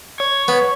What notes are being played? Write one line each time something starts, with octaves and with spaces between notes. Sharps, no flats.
C#5
B3